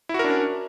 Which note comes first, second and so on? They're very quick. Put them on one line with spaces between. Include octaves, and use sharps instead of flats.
E4 F#4 A#4 D4 C#4